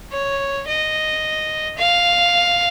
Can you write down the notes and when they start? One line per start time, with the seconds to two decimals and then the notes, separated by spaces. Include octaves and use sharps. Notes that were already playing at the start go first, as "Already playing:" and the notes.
0.12 C#5
0.67 D#5
1.78 F5